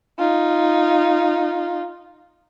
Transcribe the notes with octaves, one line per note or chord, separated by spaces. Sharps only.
D#4 F4